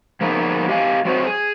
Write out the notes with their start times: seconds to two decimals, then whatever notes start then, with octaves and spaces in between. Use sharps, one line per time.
0.21 F3 A#3 B3 D#4 G#4
0.68 G4 D#5 F5 G#5
1.05 F#3 C4 F#4 C5 D#5
1.27 G#4